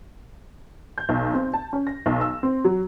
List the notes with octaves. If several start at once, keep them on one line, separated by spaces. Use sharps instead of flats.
G6
B1
C4
A5
C#4
A#6
B1
E6
C4
F#3